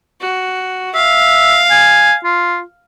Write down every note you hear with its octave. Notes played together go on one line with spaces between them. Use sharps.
F#4
E5 F5
G#5
F4